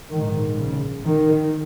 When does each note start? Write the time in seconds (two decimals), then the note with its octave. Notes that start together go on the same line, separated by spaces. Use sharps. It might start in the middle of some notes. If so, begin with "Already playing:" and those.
0.12 A#1 G#2 D#3
0.58 C#3
1.04 D#3